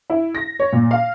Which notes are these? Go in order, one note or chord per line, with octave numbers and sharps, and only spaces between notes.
E4
A#6
C#5
A#2
F5